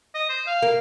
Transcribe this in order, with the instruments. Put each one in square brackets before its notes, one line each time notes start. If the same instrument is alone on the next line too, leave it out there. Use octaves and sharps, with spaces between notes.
[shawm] D#5
C5
F5
[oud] A#3